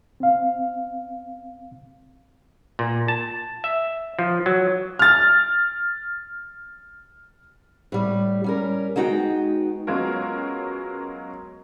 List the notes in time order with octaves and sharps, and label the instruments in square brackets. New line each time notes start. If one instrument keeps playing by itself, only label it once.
[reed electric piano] C4 F5
[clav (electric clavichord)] A#2
A5
E5
F3
F#3
[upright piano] F6 A6
[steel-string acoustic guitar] A2 G3
G3 C#4 A#4
G#3 B3 D#4 F#4 D#5 G5
[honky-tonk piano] F#3 G#3 B3 C#4 F4 A#4